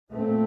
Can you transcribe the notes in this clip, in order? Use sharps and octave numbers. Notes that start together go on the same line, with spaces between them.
A#2 A3 C4